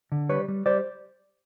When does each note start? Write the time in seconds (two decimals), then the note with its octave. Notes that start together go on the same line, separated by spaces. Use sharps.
0.12 D3
0.29 G3 B4 C#5
0.48 G3
0.66 G3 C5 D5